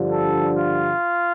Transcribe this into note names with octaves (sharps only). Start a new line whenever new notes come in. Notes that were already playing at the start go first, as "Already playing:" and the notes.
Already playing: G2 D3 F3
A4
F4